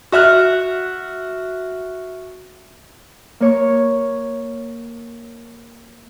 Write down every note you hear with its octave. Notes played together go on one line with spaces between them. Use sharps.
F#4 E5 F6 F#6
A#3 C#5 C#6